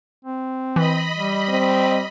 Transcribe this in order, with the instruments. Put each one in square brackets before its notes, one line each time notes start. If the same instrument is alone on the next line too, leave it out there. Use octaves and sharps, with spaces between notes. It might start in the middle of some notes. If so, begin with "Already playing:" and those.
[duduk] C4
[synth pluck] E3 [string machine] D#5 B5
[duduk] G3
[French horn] C4